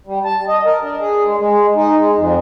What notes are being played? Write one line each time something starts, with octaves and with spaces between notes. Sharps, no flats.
G3
A5
D#5
A#4
D4
G#4
G#3
G#3
D#4
G#3
F2